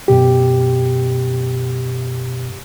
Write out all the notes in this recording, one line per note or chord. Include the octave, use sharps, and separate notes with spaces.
F#2 B2 G4